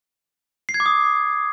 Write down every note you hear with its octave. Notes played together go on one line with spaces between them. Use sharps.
C7
G#6
D6
D#6